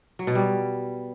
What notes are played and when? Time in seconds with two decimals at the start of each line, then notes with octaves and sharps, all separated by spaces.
0.19 F#3
0.27 B2
0.35 G3